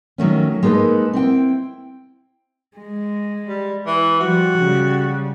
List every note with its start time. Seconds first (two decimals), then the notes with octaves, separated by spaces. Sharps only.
0.18 D#3 F#3 A3 C#4
0.63 G#3 A#3 D#4 A4 B4
1.13 C4 E4 G5
2.77 G#3
3.48 G3
3.86 E3
4.20 F3 G3 F#4
4.58 C#3 G3